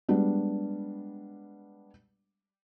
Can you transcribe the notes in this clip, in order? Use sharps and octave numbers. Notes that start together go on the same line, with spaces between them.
G3 G#3 B3 D4